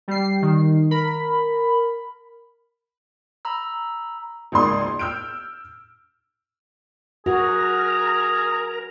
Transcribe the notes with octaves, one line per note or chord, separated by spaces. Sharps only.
G3 C7
D#3
A#4 B5
A#5 B5 E6
G#1 C#2 A#3 D5 C6 D#6
E6 F6 G6 D7
F#4 G#4 A#4 A#5